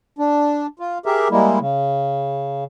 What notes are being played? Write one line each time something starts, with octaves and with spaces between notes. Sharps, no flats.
D4
F4
G4 G#4 A#4 E5
G3 G#3 A#3 E4
C#3